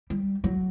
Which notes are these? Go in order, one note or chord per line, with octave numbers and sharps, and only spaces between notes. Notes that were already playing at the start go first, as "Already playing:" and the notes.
G3
F#3